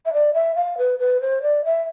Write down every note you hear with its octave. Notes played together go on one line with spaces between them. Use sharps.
E5
D5
E5
F5
B4
B4
C5
D5
E5